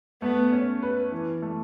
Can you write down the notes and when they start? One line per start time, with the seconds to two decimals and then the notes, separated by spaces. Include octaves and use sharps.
0.22 A3 B3
0.52 C#4
0.82 B4
1.12 E3
1.42 A3